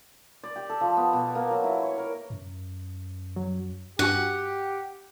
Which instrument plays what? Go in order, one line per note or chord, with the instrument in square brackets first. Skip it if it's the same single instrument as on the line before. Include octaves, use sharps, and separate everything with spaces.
[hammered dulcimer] D5
G4
A4
F3
B3
B2
A#3
F#3
E4
C#5
A#4
[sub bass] F#2
[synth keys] F#3
[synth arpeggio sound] G2 F#4 G#5 [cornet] G4 [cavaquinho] F#5